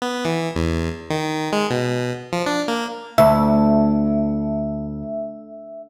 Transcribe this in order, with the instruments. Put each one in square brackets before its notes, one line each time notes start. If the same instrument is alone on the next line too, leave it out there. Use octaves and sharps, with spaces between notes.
[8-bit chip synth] B3
E3
E2
D#3
G#3
B2
F3
D4
A#3
[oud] D2 [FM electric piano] E5